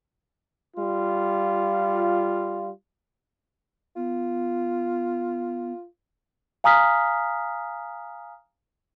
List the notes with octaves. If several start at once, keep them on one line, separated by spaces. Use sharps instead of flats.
G3 F4
B3 F4
F5 G#5 A#5 D#6 F6 B6